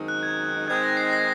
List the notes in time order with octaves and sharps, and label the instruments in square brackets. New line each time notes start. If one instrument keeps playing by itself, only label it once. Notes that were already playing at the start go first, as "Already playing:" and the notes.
Already playing: [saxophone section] F#2 D#3 G#3 C4 D#4
[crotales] F#6
G#6
[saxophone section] D#3 G#3 C4 D#4 [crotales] G#6
[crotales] A#6
C7
A#6